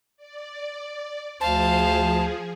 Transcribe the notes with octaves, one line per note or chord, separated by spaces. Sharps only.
D5
D2 F3 G#4 C5 F5 A5